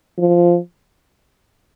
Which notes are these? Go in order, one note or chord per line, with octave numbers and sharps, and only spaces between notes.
F3